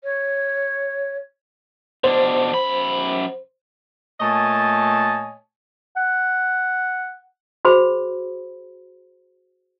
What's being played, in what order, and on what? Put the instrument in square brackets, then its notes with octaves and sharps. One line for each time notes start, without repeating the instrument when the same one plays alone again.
[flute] C#5
[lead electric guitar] B2 D4 [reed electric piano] C5
[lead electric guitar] F#2 B5
[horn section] A#2 A3 C#5 D#5 G#5 A5
[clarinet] F#5
[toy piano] F#4 G#4 C5 B5